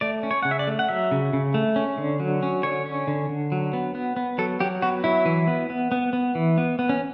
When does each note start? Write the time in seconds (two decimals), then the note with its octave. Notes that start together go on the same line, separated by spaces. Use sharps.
0.01 A3 D5
0.23 C#4
0.31 C#5
0.43 C#3 F#5
0.51 E5
0.59 D5
0.67 A3
0.79 F#5
0.89 F#3 E5
1.11 C#3
1.33 C#3
1.54 A3
1.76 C#4
1.98 D3
2.20 F#3
2.43 C#4
2.63 D3 C#5
2.86 C#4
3.07 D3
3.29 D3
3.52 F#3
3.73 B3
3.95 B3
4.16 B3
4.38 F#3 A4
4.60 F#3 G4
4.82 B3 F#4
5.04 F#3 E4
5.26 E3
5.47 B3
5.70 B3
5.92 B3
6.13 B3
6.35 E3
6.58 B3
6.79 B3
6.89 C#4